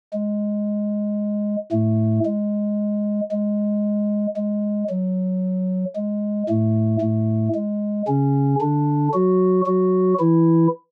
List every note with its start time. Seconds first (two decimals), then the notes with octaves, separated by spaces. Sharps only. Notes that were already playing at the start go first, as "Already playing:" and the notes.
0.13 G#3
1.72 A2 A3
2.25 G#3
3.32 G#3
4.37 G#3
4.90 F#3
5.96 G#3
6.49 A2 A3
7.01 A2 A3
7.55 G#3
8.07 C#3 C#4
8.61 D3 D4
9.14 F#3 F#4
9.66 F#3 F#4
10.19 E3 E4